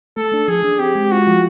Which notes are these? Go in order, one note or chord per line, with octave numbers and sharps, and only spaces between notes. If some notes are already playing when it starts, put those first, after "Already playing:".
A3 A4
D4
F3 G#4
D4
C4 G4
G#3
F4 F#4
F3